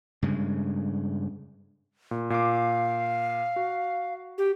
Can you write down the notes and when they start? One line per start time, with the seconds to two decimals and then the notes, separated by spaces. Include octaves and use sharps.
0.22 G2 C#3 G#3
2.11 A#2
2.30 A#2 F5 D6
3.56 F#4
4.38 G4